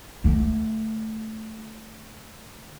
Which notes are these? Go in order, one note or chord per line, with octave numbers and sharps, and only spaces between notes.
D3 A3